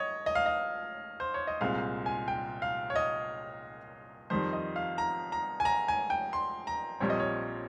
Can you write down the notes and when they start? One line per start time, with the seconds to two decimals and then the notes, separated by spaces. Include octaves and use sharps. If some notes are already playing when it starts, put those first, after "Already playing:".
Already playing: C#5 D#5
0.26 D#5
0.35 F5
0.46 D#5
1.20 C5
1.34 C#5
1.47 D#5
1.61 C2 A#2 G#3 C4 F5
2.06 G#5
2.28 G5
2.62 F5
2.90 C#5
2.96 D#5
4.30 F2 D#3 G3 C5
4.53 D#5
4.76 F5
4.98 A#5
5.32 A#5
5.60 G#5
5.65 A#5
5.88 G#5
6.10 G5
6.33 C6
6.67 A#5
7.00 A#1 A#2 G3 C4 C#5
7.10 D#5
7.20 C#5